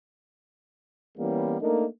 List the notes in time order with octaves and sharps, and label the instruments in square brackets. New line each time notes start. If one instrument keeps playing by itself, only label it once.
[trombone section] E2 E3 G3 A#3 B3 C#4
A3 A#3 D4 D#4 A#4